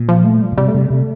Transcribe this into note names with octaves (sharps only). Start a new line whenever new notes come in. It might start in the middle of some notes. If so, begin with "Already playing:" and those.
Already playing: A#2
F3
A3
G3
A#2
C3 G3
A3
C3 G3
C3 A3